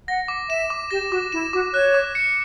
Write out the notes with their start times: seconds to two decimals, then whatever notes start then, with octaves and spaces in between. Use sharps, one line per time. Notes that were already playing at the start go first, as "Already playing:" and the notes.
0.08 F#5 A#6
0.28 D6
0.49 E5 E7
0.70 D6
0.91 G4 A#6
1.11 F#4 D6
1.32 E4 E7
1.53 F#4 D6
1.74 C#5 F#6
1.94 D6
2.15 C#7